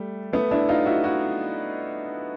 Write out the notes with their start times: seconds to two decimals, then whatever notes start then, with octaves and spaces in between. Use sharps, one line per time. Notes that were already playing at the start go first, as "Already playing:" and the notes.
Already playing: G3 A3
0.33 A3 B3
0.51 D4 E4
0.69 D#4 F4
0.86 E4 F#4
1.04 E4 F#4